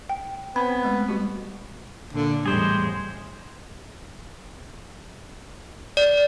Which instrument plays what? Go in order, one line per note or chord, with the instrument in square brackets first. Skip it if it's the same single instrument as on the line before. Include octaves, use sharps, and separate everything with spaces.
[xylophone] G5
[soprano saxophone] B3 [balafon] C4 C5 [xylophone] B5
[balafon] C4
G#3 A3
G3 F#4 G4
[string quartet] A#2 D5 [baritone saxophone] D3
[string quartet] E2 A2 G#3 [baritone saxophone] G3 [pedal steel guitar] G#4 C5
[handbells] D5